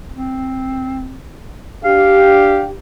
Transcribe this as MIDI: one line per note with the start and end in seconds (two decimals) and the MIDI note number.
0.12 1.20 60
1.84 2.71 62
1.84 2.71 67
1.84 2.64 77